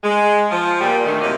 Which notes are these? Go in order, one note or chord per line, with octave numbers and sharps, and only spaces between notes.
G#3
F3
A#2 G3
D3 D#3 A3
A2 C3 F#3 A#3 D#4 G4